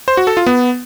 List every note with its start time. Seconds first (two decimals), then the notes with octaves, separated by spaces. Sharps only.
0.08 C5
0.17 F#4
0.27 A4
0.37 F4
0.46 B3